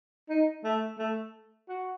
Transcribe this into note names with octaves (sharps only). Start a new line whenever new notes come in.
D#4
A3
A3
F#4